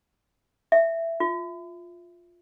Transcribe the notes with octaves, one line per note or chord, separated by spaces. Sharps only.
E5
F4